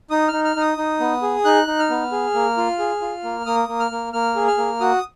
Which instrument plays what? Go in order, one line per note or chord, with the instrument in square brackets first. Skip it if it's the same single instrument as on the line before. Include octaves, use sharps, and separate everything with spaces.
[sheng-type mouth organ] D#4 D#6
D#4 F6
F6
D#4 D#6
D#4
B3
G#4
D#4 F#6
D#4
F6
B3
G#4
A#3
F4
G#4
F4
A#3
A#3 D#6
A#3
F6
A#3
A#3 F6
G#4
F6
A#3
F#4 D#6